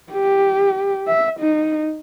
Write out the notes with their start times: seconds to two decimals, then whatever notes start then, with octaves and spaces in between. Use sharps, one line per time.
0.12 G4
1.08 E5
1.40 D#4